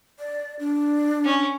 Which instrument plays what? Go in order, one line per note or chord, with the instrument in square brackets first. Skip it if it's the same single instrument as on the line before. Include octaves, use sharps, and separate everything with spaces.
[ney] D5
D4
[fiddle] C#4